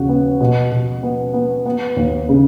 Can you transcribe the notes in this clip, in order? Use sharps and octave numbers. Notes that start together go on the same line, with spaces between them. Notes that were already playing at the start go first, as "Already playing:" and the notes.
Already playing: D#2 C#3 F#4
B3
B2
B2
B3
B3
B3
D#2
C#3